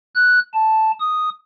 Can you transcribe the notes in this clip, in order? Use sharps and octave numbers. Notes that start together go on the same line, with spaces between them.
F#6
A5
D#6